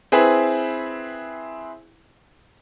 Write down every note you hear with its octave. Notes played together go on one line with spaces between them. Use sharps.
C4 E4 G#4 B4